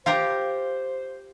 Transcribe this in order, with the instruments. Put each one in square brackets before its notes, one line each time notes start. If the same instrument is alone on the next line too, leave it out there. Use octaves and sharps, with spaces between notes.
[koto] F4 G4 A#4 [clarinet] C5 [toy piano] F5